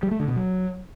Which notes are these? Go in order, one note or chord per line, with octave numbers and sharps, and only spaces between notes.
G3
A3
D3
B2
F#3